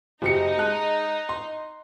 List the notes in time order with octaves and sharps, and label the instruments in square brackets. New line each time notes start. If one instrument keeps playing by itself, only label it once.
[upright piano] F#1 G4 C#7 [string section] D#4
[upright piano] G#3 A5 F#6
C6